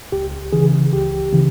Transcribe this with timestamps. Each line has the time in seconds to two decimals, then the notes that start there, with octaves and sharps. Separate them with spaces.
0.12 C#2 G4
0.52 C#3 E3 G#4
0.93 C#2 G4
1.32 C#3 E3